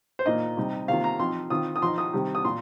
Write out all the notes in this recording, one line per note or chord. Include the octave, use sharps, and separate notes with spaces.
C5
A#2 A#3 D#4 D#5
C3 G3 D#4
C3 D#3 A#3 F4 F5
A#5
F3 C4 D#4 C6
D#3 C4 F4 D#6
D#6
F3 D#4 C6
D#6
C3 D#3 G3
D#6
A#2 C6